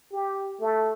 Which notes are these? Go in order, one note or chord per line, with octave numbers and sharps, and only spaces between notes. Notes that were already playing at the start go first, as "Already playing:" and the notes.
G4
A3